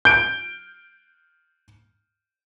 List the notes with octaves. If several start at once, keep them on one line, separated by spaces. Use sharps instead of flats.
G6 D7